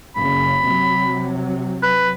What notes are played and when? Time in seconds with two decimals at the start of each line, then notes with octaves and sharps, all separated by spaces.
0.16 F#1 C#3 B5
0.65 C3 F#3
1.83 B4